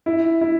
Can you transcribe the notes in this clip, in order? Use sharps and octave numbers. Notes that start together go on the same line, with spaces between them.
E4
E4